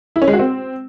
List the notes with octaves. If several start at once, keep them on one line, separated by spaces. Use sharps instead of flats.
E4
C#4
G#3
F#4
C4